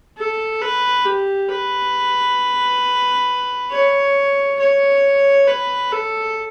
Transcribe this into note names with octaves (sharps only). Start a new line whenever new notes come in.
A4
B4
G4
B4
C#5
C#5
B4
A4